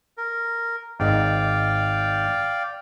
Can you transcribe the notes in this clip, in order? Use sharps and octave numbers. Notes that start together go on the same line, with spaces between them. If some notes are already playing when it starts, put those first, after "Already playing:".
A#4
G#1 G#2 D5 D#5 F5 G5